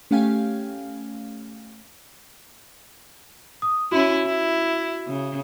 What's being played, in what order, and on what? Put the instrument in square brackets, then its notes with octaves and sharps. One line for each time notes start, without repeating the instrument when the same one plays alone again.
[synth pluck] A3 C#4 G4 F5 G5 G#5
[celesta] D#6
[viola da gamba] C#4 E4 [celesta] F#4
[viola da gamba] E4
C#3